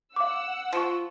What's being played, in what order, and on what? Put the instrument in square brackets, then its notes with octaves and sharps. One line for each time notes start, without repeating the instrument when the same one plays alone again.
[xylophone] F5 D6 [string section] F#5 E6
[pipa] F3 [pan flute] F4 [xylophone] C#6 D#6